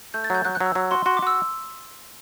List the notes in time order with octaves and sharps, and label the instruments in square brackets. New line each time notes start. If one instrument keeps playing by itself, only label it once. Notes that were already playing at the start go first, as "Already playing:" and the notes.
[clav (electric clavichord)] A3 [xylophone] G6
[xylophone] A6
[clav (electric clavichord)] F#3 [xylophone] G6
[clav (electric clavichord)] F#3 [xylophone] F#6
[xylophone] F#6
[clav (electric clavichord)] F#3
[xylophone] E6
[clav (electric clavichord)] F#3
[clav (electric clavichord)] F#4 [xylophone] C6
[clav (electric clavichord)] F#4 [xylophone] C6
[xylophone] D6
[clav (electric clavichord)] F#4 [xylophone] E6